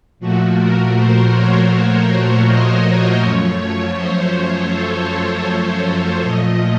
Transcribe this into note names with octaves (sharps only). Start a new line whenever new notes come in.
A#2 F3 A3 F#4
A#4
C5
C#5
C#5
D#5
C#5
F#2 F3 A3
C5
A4
C5
C#5
A#2 F3 A3 D#5